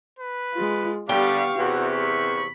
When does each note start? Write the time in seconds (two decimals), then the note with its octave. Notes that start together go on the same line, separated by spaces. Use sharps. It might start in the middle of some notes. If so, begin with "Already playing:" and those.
0.19 B4
0.54 G#3 F4
1.09 D3 G3 B3 G4 E5 F5 C#6
1.58 E2 C3 F#4
1.95 B5 C#6